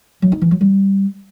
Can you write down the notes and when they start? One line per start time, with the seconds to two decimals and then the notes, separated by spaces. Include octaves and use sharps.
0.22 F#3
0.32 D#4
0.42 E3
0.51 F#3
0.61 G3